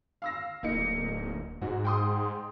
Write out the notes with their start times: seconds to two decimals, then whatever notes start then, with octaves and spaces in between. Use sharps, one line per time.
0.22 F5 E6 A#6
0.63 D1 A#3 D#4 C#7
1.61 G#2 F#4
1.85 G5 C6 D#6